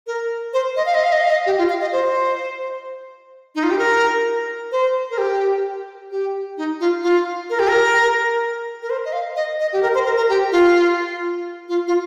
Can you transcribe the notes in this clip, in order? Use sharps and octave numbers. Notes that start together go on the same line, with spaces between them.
A#4
C5
D#5
F5
D#5
F5
D#5
F5
D#5
G4
F4
F5
D#5
C5
D#4
F4
G4
A#4
C5
A#4
G4
G4
D#4
F4
F4
A#4
G4
A#4
A#4
C5
D#5
F5
D#5
D#5
G4
A#4
C5
A#4
A#4
G4
F4
F4
F4